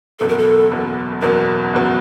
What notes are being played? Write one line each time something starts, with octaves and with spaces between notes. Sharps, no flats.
F#1 E2 B2 F#3 A4
A#4
A4
F#1 E2 B2 F#3
F#1 E2 B2 F#3 A#4
F#1 E2 B2 F#3